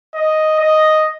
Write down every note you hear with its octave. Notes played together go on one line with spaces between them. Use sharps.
D#5
D#5